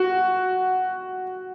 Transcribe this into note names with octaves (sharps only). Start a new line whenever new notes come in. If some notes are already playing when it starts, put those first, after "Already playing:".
Already playing: F#4